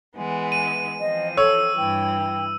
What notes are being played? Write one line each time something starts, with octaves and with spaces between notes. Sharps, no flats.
E3 G#3 B3
D#7
E3 F3 C4 D#5
A4 C#5 E6
G2 E3 G5